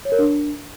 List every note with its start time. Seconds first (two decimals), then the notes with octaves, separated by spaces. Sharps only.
0.05 C#5
0.12 A#4
0.19 D4